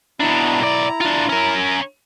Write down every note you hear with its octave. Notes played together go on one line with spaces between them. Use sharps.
B2 D4 E4 A#5
B1 D5
D4 F4
C#4 A#4